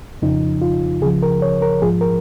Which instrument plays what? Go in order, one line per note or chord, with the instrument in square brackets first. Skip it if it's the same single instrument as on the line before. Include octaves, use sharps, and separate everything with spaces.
[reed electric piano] F2 C#3 F3 D#4
F4
C#2 C#3 F3 G#4
A#4
C#5
A#4
G#2 F3 G#4
A#4